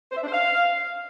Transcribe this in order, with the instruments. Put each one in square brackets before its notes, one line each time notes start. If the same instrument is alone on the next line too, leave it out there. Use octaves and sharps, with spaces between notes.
[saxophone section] C5
E5
D4
C5
F5